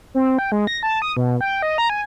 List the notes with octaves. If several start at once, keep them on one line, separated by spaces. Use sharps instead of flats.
C4
G5
G#3
A#6
A5
D#6
B2
G5
D#5
A#5
G#5